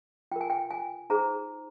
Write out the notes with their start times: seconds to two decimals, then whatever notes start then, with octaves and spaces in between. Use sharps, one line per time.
0.32 F4 G5
0.36 A#4
0.41 G#5
0.50 G5
0.71 G#5
1.10 D#4 G#4 C5 A#5